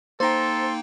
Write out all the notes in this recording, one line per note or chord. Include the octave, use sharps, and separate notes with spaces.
A#3 D#4 A4 C5 G5 A#5 C6